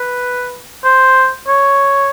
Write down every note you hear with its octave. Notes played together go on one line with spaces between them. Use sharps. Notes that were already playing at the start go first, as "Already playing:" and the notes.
Already playing: B4
C5
C#5